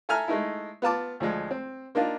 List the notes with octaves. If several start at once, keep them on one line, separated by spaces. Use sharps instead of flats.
A4 E5 G#5 A#5 F6
G#3 A3 D#4 E4
B3 F4 A5 D6
D2 F3 G#3
C4
A#3 D4 D#4 F4